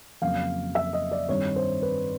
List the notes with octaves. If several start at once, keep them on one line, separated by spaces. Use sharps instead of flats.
F2 C#3 F#3 A#3 F5
E5
D#5
D5
G2 D#3 G3 C4 C#5
C5
B4